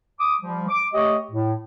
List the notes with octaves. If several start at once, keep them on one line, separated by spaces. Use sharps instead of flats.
D6 D#6
F3 G3
D6
A3 G4 C#5 D#5
A2